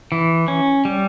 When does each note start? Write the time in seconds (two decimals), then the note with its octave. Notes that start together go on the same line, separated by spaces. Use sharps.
0.12 E3
0.48 C#4
0.85 G3